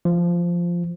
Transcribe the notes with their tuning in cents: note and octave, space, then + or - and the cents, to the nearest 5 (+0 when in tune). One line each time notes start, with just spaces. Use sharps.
F3 -10